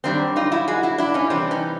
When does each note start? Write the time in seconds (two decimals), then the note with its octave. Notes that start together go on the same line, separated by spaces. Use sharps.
0.04 F#2 D#3 G3 C4 D4
0.36 D#4 F4
0.52 E4 F#4
0.68 F#4 G#4
0.83 E4 F#4
0.98 D4 E4
1.14 C#4 D#4
1.30 C3 E3 G3 C4 D4
1.51 C#4 D#4